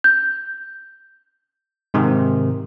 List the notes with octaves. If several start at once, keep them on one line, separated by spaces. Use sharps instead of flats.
G6
G#2 C3 D#3